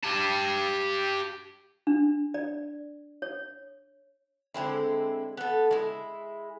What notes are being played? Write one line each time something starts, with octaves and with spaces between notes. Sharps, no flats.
G4 A5
D4
D5
C#5
D3 G#3 C4 E4
B3 A4
G#3 E4